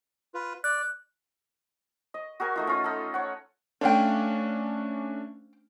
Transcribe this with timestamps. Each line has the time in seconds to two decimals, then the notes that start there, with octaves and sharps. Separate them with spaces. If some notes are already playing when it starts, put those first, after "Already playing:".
0.34 F4 B4
0.64 D5 F#6
2.14 D#5
2.40 F#4 G#4 A#4 G#5
2.56 A3 D#4 F4
2.67 C#4 F4 D#6
2.84 D#4 A4
3.14 C#5 F#5
3.81 A3 C#4 D4 C5 F5 G5